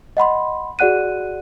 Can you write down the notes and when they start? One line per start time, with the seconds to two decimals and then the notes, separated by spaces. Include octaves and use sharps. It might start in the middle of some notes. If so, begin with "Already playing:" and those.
0.17 D#5 F#5 B5 C6
0.79 F#4 G#4 D5 F#5 F#6 D#7